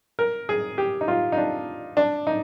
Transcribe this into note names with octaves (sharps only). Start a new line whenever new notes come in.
A#4
G#4
G4
D#4
F4
D#4
D4
D4
D#4